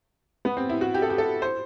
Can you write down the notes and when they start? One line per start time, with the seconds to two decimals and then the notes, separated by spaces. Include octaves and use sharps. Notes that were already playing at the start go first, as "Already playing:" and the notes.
0.45 B3
0.57 C4
0.69 E4
0.81 F#4
0.94 G4
1.02 A4
1.10 G4
1.18 A4
1.42 C5